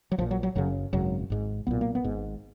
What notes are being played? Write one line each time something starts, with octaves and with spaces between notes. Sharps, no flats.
F#3
A#1 A#2 F3
F#3
F#3
F#1 F#2 C#3 F#3
G#1 F#2 C#3 F#3
G#1 G#2
B1 A#2 B3
A#3
B3
G#1 G#2